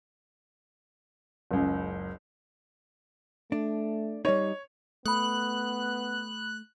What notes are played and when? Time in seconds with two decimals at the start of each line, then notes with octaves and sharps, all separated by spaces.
1.51 F#1 C#2
3.52 A3 D4
4.25 G3 D#4 C#5
5.05 A3 B3 B5 D#6 F#6